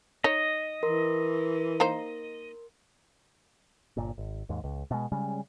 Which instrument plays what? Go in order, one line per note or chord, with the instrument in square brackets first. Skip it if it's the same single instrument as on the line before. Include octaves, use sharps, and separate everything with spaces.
[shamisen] D#4 C#5 [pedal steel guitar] D#5
[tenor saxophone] E3 [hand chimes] A#4 C6
[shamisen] A#3 D#4 C5
[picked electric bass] G1 A#2
G#1
D#2 G#2
C#2
B2 G#3
C#3 G3 G#3 C#4